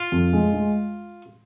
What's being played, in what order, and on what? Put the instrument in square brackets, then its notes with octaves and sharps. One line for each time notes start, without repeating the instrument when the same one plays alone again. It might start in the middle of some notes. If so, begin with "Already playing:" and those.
Already playing: [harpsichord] F4
[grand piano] F2
G#3
G#3